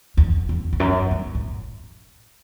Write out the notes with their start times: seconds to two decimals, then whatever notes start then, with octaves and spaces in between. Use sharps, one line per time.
0.17 E2
0.49 E2
0.73 E2
0.80 F#2
1.11 G2
1.35 A2